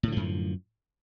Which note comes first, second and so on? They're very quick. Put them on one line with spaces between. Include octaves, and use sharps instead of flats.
A2 D3 F3 F#2